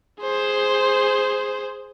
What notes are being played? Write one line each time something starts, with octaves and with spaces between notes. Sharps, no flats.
G#4 C5